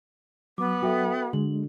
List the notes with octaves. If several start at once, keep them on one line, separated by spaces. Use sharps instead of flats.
F#3 B3 D6
F#4 A4 E5 G5
D3 G#3 F#7